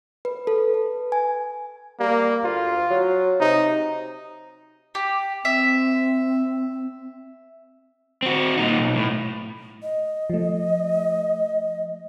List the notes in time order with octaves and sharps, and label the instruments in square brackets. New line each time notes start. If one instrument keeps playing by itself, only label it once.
[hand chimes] B4
A4
B4
G#5
[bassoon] G3 [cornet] A#3
[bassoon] D2 [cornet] F4
[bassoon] F#3
[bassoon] C3 [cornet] D#4
[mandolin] G4
[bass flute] C4 [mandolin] E5
[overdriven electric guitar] C4 F#4
A#2 D#4
B1
A2
[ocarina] D#5
[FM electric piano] F3 A3